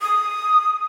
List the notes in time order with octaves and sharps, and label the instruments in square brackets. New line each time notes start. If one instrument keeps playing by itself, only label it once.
[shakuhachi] D#6